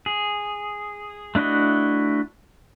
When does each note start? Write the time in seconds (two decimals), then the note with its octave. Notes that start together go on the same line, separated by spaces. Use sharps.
0.06 G#4
1.35 A3 D4 E4 F#4 D#5